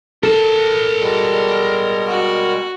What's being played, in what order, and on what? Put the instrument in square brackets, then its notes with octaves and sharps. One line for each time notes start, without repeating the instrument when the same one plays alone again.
[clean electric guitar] A4 [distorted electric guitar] A#4 A5
[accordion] B2 G3 G#3
[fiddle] F#4